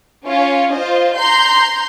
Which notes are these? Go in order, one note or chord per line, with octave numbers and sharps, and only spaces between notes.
C#4 F4 C#5
F4 C5 D#5
A#5 C6 G6